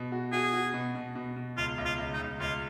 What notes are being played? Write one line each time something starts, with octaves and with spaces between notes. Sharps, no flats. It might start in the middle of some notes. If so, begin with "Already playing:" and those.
Already playing: B2
F#4
F#4 G#4
F#4
B2
B2
B2
B2
C#2 F4
C#2
F4
C#2
D#4
C#2
C#2 F4